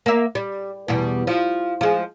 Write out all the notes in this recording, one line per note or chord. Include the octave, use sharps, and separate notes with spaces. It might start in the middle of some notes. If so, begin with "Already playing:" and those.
A#3 E5
G3
E2 B2 G3
F3
F3 G#3